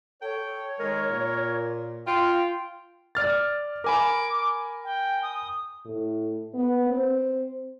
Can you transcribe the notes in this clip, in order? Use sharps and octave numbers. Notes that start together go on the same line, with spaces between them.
A4 C#5 G5
D#3 G#3 A#4
A#2
F4 G5
D5 F6 A6
A#4 G#5 B5 D6
G5
D#6
A2
B3
C4